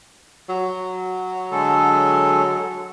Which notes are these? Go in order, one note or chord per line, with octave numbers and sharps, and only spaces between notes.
F#3
D3 G#3 A4